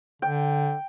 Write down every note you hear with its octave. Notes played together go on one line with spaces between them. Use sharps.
D3 G5